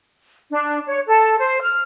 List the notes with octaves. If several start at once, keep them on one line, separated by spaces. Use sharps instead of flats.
D4
C#5
A4
C5
F6